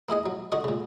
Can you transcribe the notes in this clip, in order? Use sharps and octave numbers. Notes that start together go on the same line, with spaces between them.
A#3 E4 G#4 D#5
F#3
D3 F#4 D#5 C#6
A#2 C#3